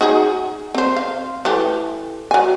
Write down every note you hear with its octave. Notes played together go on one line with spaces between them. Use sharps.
D#4 F#4 G#4
C4 C5
F5
E3 A3 G4
F#3 G#5